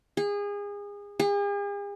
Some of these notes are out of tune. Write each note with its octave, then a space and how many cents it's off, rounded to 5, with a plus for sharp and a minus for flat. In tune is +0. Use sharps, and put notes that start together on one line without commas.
G#4 -30
G#4 -45